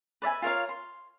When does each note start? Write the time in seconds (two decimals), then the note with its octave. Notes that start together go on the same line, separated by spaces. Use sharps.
0.22 B4 D5 E5 G#5
0.42 F4 A#4 C#5 F5
0.69 C6